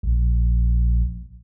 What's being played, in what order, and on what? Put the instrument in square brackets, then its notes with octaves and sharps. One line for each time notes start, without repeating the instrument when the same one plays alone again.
[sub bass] A#1